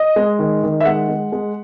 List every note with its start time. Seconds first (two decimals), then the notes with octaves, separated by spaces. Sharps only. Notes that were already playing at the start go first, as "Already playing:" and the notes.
Already playing: D#5
0.16 G#3
0.39 D#3
0.63 D#3
0.81 E5
0.85 G#3 F#5
1.08 G#3
1.32 G#3